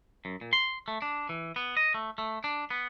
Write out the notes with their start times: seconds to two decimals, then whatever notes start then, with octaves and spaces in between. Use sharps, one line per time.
0.25 F#2
0.41 A#2
0.53 C6
0.88 A3
1.02 D4
1.29 E3
1.56 B3
1.77 D#5
1.94 A3
2.18 A3
2.44 D4
2.71 B3